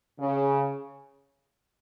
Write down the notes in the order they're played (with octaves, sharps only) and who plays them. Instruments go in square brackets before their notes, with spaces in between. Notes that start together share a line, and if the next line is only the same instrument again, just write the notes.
[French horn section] C#3